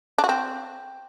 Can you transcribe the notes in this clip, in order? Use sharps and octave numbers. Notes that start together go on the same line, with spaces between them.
D4
F#4
C4